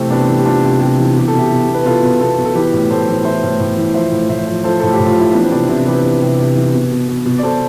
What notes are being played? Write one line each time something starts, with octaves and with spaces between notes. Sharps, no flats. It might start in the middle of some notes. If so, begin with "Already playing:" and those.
Already playing: C3 E3 A3 C4
C3 B3 D4
E3
G4
E3 D4 F4
C3
C3
E3
B2 G4
A4
B2 E4 G4
B2
B2
B4
B2 F4 A4
B2
B2 F4 A4
B2
A4
E3 G4 B4
A2
A2 A4 C5
E3
E3 C5 E5
A2
A2
E3
F3 C5 E5
A2
A2 C5 E5
F3
F3 A4 C5
A2 A4
G4
A2
F4
F3 E4
E3 B3 D4
C4
C3 B3 D4
C3 C4 E4
E3 G4 B4
E3
C3
C3
E3
B2
B2
B2
B2
D5
B2 A4 C5